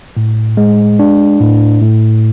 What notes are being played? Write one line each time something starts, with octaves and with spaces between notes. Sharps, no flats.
A2
G#3
D4
A2
A2